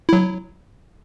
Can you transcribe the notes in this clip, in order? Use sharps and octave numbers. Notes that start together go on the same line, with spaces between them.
F#3 E4